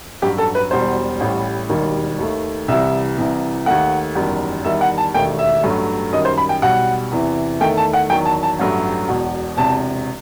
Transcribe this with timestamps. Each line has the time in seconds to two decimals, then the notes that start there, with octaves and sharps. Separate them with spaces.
0.22 A1 G2 F#3 G4
0.38 A4
0.55 B4
0.71 E1 E2 B2 G3 C5
1.20 A1 A2 G3
1.69 E1 D#2 D#3 G3
2.19 D#2 D#3 A3
2.68 C2 C3 E3 G3 E5
3.17 C2 C3 E3
3.66 D#2 D#3 A3 F#5
4.15 F#1 E2 D#3 G3
4.64 E2 D#3 G3 E5
4.81 F#5
4.98 A5
5.14 E1 D#2 D#3 A3 G5
5.39 E5
5.63 A1 G2 F#3 A3
6.13 F#2 D#3 G3 D#5
6.25 C5
6.38 B5
6.49 G5
6.62 B1 B2 G3 F#5
7.12 E2 C3 E3
7.60 E2 D#3 A3 G5
7.77 A5
7.93 F#5
8.10 E2 D#3 F#3 G5
8.25 A5
8.43 A5
8.59 A1 G2 F#3 A3
9.08 E1 E2 B2
9.57 E1 E2 C3 A5